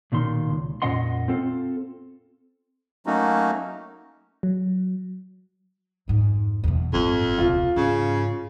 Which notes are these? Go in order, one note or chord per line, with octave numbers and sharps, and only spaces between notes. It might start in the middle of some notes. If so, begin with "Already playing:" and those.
B1 A#2 D#3 C6
C#2
F2 A#2 C#4 D#5 F#5 C6
C4 F4 A4
F#3 A3 A#3 C#4 D#4 F#4
F#3
F2 G#2
E2 B2
G1 F2 A2
E1 C#2 F4
G#2 C#3